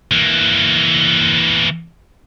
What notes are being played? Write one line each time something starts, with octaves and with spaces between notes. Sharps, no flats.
E3 A#3